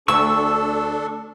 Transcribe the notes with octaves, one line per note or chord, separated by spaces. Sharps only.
D2 D4 A4 C#6 E6